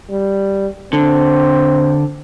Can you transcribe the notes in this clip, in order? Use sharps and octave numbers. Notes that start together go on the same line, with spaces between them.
G3
D3 C4